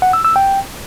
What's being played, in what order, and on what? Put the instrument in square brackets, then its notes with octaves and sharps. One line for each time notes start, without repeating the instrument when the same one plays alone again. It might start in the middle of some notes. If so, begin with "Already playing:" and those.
[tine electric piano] F#5
E6
E6
G5